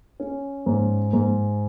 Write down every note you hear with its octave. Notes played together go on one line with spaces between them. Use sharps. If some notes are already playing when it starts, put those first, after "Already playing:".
C#4
G#2
G#2